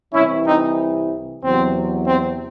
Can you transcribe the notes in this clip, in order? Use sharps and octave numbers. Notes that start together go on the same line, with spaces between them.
C2 C3 E3 C#4 E4
C4 D#4
E2 C3 F#3 C4
C4